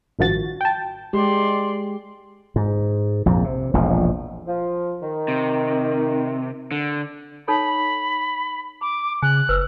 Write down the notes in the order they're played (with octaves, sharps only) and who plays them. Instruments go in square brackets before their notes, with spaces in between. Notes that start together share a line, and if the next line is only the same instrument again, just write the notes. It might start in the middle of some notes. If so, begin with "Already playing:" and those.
[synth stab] A1 G2 D#3 F3 F#4 A6
G5 A5
[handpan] G#3 G4 [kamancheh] D5 C6
[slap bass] G#2
A#1 F2 G#2
C3
E1 A#1 A2 F3
[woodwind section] F3
D#3
[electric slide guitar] C3
D3
[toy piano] D#4 A4 C#5 [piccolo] B5
[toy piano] B5 [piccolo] D6
[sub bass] C#3 [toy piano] G#5 [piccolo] F#6
[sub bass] F#1 [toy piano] B4 C5 E6